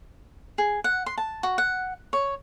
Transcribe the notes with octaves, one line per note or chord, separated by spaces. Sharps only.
G#4
F#5
C6
A5
F#4
F#5
C#5